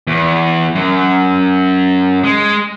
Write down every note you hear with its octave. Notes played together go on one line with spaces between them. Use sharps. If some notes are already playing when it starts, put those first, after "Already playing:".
E2
F#2
G#3